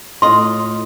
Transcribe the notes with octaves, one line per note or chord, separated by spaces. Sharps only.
A2 F4 D#5 C6